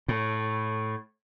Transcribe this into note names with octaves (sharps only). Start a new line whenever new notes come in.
A2